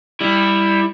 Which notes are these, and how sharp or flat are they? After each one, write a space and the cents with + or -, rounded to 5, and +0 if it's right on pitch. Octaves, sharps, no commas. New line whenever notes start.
G3 +15 E4 +0